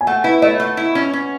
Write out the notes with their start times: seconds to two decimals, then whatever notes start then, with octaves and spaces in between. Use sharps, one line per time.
0.01 G#5
0.07 A3 F#5
0.24 E4 B4
0.42 A3 D#5
0.60 A3
0.77 E4
0.95 C#4
1.14 C#4